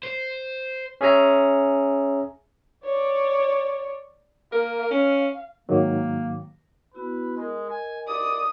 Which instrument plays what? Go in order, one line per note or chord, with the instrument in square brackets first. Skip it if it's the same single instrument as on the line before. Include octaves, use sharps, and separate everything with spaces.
[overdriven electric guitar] C5
[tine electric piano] C#4 G#4 E5 G#5 A#5
[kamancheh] C#5 D5
[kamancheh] A#3 [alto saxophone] A#4
[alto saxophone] C#4 [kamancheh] F5
[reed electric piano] G#2 D#3 F#3 [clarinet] A#3
[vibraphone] B3 E4 F#4 [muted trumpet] B4
[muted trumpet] G#3 [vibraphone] A#4 D#5
[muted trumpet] G#5
[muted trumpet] D5 [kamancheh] D#6